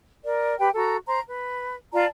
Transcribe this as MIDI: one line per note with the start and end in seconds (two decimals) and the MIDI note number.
0.24 0.58 70
0.24 0.58 74
0.59 0.70 67
0.59 0.70 71
0.59 0.70 79
0.75 0.97 66
0.75 0.97 69
0.75 0.97 82
1.06 1.20 72
1.06 1.20 82
1.28 1.76 71
1.93 2.05 65
1.93 2.05 74
1.93 2.05 81
1.93 2.05 82